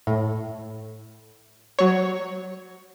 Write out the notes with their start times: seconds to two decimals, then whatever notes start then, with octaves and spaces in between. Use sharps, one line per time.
0.07 A2
1.79 F#3 C#5